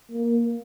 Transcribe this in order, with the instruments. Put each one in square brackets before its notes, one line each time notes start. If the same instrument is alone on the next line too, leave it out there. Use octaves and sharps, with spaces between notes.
[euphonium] A#3